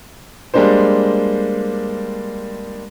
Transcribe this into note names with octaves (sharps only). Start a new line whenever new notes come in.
G3 G#3 A#3 D4 C5